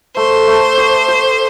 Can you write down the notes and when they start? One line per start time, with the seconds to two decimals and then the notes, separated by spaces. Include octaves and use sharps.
0.16 A3 C5
0.48 A3
0.77 G4
1.08 G4